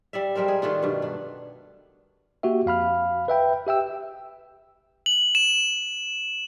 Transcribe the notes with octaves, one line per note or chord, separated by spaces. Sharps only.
G3 D5 E5
G3 G#3 A#4 C5
G#4
D#3 A3 D4 F4
G2 B2
D4
A#3 F#4 G4 E5
F2 F5 B5 F6
B4 E5 G5 B5
G4 E5 G5 E6
F#7
E7